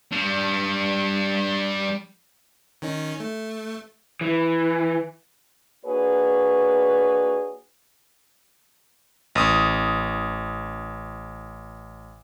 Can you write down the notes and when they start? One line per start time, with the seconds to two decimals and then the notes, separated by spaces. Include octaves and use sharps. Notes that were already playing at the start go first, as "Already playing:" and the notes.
0.12 G3 D4
2.82 D#3 C#4 D#4
3.20 A3
4.21 E3
5.85 A#3 D4 F#4 G#4 B4 C#5
9.35 A1 D#6